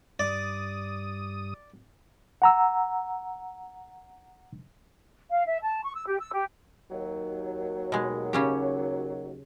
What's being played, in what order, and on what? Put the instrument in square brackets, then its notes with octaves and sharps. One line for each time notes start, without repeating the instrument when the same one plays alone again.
[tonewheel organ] G2 D#6 [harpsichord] D5
[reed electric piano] F#5 A#5 E6
[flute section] F5
E5
A5
C#6
E6
G4
E6
G4
[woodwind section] D#2 F#3
[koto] B2 G#3
C#3 C#4 G4